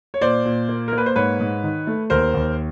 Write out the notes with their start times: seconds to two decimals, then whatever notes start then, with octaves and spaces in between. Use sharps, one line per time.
0.14 C#5
0.21 A#2 C5 D5
0.45 A#2
0.69 A#3
0.88 A#4
0.93 A#3
0.98 B4
1.06 C5
1.16 G#2 B4 C#5
1.40 G#2
1.63 D#3
1.87 A3
2.10 D#2 A#4 C5
2.34 D#2